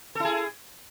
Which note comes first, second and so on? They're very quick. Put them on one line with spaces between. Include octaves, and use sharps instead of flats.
A4 E4 G#4